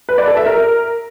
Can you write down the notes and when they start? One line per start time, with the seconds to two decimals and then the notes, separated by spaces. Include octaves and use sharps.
0.09 B4
0.18 D5
0.27 A4
0.37 E5
0.46 A#4